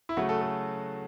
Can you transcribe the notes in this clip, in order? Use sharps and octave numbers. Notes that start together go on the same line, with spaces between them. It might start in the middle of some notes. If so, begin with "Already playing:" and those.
E4
C#3 F#3 A3 F#4
A4
A4